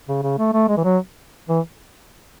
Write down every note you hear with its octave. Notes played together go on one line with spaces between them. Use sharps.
C#3
C#3
A3
A3
G#3
E3
F#3
E3